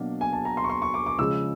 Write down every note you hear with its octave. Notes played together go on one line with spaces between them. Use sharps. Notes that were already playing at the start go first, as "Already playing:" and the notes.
Already playing: B2 F#3 A#3 D4
G#5
A5
A#5
C6
C#6
C6
C#6
D6
D6
C#3 F3 G#3 E6